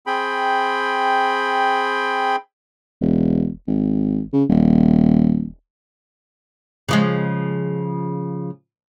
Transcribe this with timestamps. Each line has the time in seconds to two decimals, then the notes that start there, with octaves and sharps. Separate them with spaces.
0.07 C4 G#4 G5 B5
3.01 E1
3.67 G#1
4.33 C#3
4.49 D#1
6.89 C#3 F3 G#3